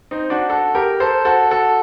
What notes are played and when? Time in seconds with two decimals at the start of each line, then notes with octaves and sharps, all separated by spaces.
0.11 C4 D#4
0.30 D4 F#4
0.49 F#4 A4
0.75 G4 A#4
1.00 A4 C5
1.25 F#4 A4
1.51 F#4 A4